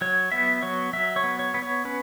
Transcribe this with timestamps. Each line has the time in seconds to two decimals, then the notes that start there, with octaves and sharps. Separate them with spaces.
0.01 F#3 C#5
0.32 B3 E5
0.63 F#3 C#5
0.93 F#3 E5
1.16 C#5
1.24 B3
1.39 C#5
1.54 B3
1.62 C#5
1.85 C#4 B4